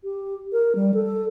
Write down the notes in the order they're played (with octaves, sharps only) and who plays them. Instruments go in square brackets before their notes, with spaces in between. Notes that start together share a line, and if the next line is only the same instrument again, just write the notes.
[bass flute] G4
A#4
G3
A4